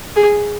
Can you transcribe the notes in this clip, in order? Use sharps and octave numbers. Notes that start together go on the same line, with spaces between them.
G#4